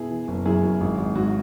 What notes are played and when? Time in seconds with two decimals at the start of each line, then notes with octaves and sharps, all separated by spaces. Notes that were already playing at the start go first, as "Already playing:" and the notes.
Already playing: B2 E4 G#4
0.11 E3
0.28 F#1
0.46 F#2 E4 G#4
0.63 F#2
0.81 G#1
0.98 G#1
1.15 G#2 F#4